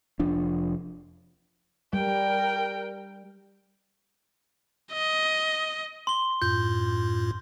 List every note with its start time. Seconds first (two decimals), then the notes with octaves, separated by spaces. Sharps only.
0.19 F1 F3 D4
1.93 G3 A#4 G5
4.93 D#5
6.07 C6 G7
6.42 F#2 A2 F4 G6